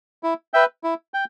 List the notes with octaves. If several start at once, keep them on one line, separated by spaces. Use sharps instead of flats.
E4
B4 E5 G5
E4
G5